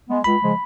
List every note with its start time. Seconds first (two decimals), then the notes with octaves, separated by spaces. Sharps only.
0.09 G#3 B3
0.24 C#2 B5
0.42 C#3 F3 G#3